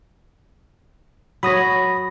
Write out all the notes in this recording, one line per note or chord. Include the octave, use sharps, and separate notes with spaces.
F#3 C#5 B5 D#6 A#6